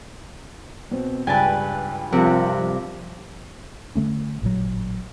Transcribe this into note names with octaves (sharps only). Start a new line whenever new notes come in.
B2 C4
C#2 G2 G4 B4 G#5 A5
G2 C3 F3 F#4 A#4
D3 E3 A3 C#4
A1 A#2 F#3